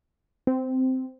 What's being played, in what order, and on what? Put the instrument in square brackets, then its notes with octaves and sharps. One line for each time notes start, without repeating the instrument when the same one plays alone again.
[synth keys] C4